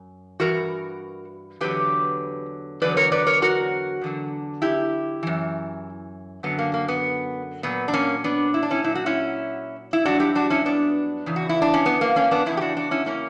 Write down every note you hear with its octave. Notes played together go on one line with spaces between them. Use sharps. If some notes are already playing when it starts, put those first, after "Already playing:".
Already playing: F#2
G2 E3 F#4 A#4
E2 D3 F#3 G4 B4
E2 D3 F#3 B4 D5
A#4 C#5
B4 D5
A#4 C#5
F#4 A#4
E2 D3 F#3
E4 G4
F#2 E3
F#2 D3 F#3 B3
A#3
A#3
B3
A#2 F#3 B3
D4
A#3 C#4
B3 D4
E4
D4
C#4 E4
A#2 F#3 E4
F#4
C#4 E4
E4
G2 F#3 D4 F#4
E4 G4
D4 F#4
C#4 E4
B3 D4
E2 C#3 E3
F#4
E4
D4
C#4
B3
A#3
A#3 C#4
B3 D4
E2 C#3 C#4 E4
G4
D4 F#4
D4 F#4
C#4 E4
A#3 C#4